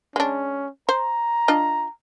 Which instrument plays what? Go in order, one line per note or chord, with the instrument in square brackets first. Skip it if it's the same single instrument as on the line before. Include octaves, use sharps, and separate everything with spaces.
[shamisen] G#3 D4 [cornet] C#4
[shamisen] C5 [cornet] A#5
[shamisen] D4 F4 D#5